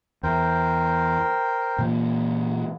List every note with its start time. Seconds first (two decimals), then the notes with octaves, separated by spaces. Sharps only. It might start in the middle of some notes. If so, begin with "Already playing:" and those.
0.23 E2 A#4 C5 G5
1.78 A#2 E3 A#3